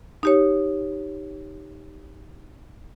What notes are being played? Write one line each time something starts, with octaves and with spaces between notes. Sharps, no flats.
D#4 G4 C#5